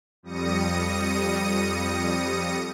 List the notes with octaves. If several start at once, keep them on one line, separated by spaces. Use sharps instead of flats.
F2 G3 D#6 A#6 C#7 D#7